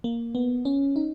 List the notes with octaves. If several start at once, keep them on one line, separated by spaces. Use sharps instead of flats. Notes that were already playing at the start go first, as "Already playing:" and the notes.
A#3
B3
C#4
D#4